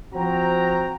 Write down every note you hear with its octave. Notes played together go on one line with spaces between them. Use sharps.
F3 C4 F#4 C5 G5 A#5